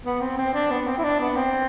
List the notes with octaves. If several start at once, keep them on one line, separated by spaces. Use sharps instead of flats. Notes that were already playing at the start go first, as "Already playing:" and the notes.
B3
C4
C4
D4
B3
C4
E4
D4
B3
C4